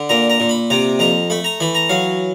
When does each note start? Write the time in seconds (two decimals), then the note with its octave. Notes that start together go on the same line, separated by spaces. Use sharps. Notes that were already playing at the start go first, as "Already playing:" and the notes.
Already playing: D3
0.09 A#2 A#5
0.30 A#5
0.40 A#2
0.49 B5
0.70 C3 A#5
0.99 F2 A#5
1.30 A3 B5
1.44 A#5
1.60 E3 B5
1.75 A#5
1.89 F#3 F5